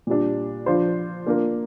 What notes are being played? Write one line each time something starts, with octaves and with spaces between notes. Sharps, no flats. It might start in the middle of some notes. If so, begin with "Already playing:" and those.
A#2 G3 D4
F3 D4 F4 C5
A#3 D4 F4 A#4